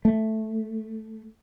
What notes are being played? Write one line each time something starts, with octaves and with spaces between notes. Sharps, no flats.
A3